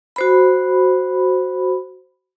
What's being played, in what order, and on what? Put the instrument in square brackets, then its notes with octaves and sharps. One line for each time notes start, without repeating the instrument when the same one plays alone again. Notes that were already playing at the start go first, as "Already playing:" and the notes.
[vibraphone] F#4 C5 B5